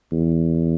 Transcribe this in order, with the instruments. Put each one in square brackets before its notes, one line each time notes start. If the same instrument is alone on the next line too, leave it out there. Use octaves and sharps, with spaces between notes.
[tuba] E2